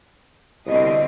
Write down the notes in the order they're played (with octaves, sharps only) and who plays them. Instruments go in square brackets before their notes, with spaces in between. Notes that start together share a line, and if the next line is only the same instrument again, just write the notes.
[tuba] C2 [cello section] B2 D3 C4 [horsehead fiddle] D#5